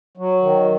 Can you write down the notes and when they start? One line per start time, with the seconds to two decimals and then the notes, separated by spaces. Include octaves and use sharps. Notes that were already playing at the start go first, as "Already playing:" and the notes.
0.17 F#3
0.42 D#3